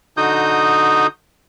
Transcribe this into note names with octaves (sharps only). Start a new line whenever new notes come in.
D3 D#4 F#4 D#6 G6